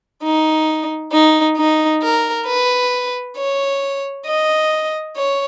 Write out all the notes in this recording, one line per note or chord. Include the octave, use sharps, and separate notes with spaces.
D#4
D#4
D#4
A#4
B4
C#5
D#5
C#5